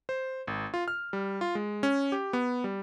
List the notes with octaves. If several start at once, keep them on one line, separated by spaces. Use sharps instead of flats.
C5
G#1
F4
F6
G3
F4
G#3
C#4
G4
B3
G3